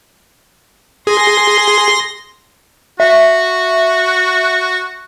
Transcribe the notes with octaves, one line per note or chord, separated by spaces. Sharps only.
G#4 C6 A#6
F#4 E5